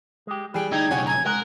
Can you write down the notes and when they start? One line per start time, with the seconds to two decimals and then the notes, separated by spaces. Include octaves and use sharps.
0.27 G#3 G4
0.54 E3 G3 G#4 G5
0.72 D2 D#4 E4 G5 G#6
0.91 B1 C#3 C#5 F#5 G#5
1.07 G#5 A#5 G#6
1.26 G#3 A#4 F#5 F#6